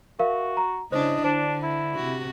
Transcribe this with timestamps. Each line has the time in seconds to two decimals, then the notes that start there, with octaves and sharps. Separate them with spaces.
0.19 F#4 A#4 E5 F5
0.57 A#5
0.92 C#3 D4 E4 C5 D#5
1.24 D3 D4 C5
1.63 E4
1.95 C3 F#4